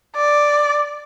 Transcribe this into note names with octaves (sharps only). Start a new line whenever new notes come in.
D5